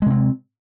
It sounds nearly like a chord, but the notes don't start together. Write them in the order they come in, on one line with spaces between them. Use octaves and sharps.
G#3 C3 C4